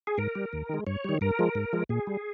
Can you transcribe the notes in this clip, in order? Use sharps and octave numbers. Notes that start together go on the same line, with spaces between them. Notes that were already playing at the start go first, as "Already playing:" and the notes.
G#4
G#2 A#4
G3
D#2
D#3 G#3
G2 C#5
D#3 G3
G2 A#4
F3 G#3
G#2
F3 G#3
A#2 G#4
G3